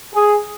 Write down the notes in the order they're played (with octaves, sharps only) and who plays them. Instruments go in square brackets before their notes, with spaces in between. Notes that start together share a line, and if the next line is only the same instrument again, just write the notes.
[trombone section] G#4